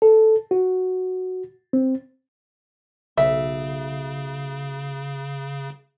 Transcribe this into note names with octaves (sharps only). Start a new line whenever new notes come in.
A4
F#4
C4
B1 C#3 E5